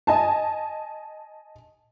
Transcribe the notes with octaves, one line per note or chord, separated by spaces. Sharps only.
D#5 G#5 A5